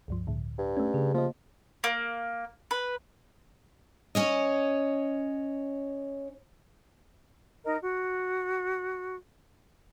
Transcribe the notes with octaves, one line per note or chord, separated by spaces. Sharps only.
C#2 G2 F3
C#2 A2 D3
G2
A3 C#4
C#3 G4 G#4
F3 A#3 D#5
A#3
B4
C#4 C#5 D#5
D#4 A#4 D#5
F#4